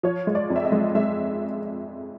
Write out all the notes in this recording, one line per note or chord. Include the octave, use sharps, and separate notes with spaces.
F3 C#5
G#3
D5
F2
E5
D#5
G#3
G#3 E5